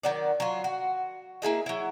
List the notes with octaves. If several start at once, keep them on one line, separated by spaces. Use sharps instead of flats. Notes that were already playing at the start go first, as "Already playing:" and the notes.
D#3 F#3 D5
F#3 F4
F#4
A#3 E4 G#4 D#5
F#3 E4